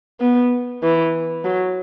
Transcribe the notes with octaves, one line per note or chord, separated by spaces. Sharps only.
B3
E3
F#3